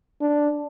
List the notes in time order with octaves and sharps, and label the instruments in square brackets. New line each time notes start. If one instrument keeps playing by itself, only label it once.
[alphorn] D4